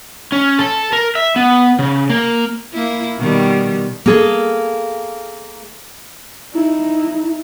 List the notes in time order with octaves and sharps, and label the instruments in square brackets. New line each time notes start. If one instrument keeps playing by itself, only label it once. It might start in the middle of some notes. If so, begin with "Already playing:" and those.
[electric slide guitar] C#4
A4
A#4
E5
B3
C#3
A#3
[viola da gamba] A#3 E4
B2 D#3 G3
[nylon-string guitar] A#3 G#4 A4
[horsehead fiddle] D#4 E4